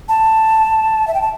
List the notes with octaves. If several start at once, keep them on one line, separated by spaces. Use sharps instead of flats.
A5
E5
G5
A5